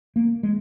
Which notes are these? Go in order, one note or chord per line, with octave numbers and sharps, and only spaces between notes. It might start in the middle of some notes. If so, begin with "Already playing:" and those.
A#3
G#3